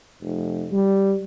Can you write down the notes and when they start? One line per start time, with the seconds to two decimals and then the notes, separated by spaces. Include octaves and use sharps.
0.21 F1
0.72 G3